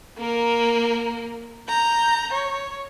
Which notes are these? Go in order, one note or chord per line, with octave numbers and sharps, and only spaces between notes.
A#3 A#4
A#5 G6
C#5